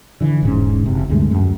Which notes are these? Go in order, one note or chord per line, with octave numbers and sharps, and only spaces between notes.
D3 E3
E1 G#2 C#4
F#1 C3
D2 G2 G#3 A3
F#2